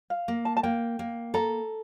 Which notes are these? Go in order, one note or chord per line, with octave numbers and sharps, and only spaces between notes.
F5
A#3
A5
A5
A#3 G5
A#3
A4 A#5